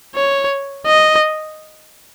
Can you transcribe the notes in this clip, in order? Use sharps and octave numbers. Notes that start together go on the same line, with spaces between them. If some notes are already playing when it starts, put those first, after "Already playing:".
C#5
D#5